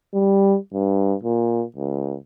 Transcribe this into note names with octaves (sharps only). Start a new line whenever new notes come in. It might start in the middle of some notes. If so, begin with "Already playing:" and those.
G3
G2
A#2
C#2